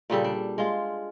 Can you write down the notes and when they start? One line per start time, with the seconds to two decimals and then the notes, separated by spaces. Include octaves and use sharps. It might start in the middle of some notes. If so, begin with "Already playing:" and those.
0.10 A#2 C#3 G3 A4
0.24 D4
0.58 G#3 F4